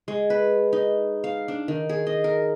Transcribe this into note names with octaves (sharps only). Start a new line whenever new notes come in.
G#3
B4
D#4
F5
D4
D#3
G#4
D#5
A#4